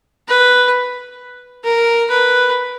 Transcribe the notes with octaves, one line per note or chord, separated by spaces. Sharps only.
B4
A#4
B4